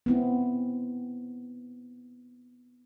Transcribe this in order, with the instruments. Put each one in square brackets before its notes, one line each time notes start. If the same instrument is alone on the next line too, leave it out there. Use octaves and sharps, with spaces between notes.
[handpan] B3 C4 E4